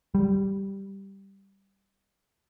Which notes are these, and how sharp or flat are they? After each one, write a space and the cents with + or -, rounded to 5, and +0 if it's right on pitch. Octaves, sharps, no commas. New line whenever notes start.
G3 -5